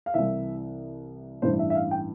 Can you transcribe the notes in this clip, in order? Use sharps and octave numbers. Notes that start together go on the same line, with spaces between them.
F5
C2 C3 E3 E5
A1 G2 E3 C5
E5
E5
F5
G5